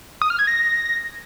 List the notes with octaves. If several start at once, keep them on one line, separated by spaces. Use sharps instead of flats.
D#6
F6
G#6
A#6